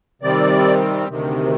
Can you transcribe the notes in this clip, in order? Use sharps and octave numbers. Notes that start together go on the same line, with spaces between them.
C3 D#3 G3 C4 D5
D2 C3 D#3